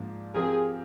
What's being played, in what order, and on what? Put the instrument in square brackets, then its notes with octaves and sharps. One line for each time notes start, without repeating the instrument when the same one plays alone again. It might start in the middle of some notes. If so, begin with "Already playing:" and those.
Already playing: [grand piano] G#2 F3 A#3 D4
[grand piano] F3 C4 G4 A#4 [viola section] G#4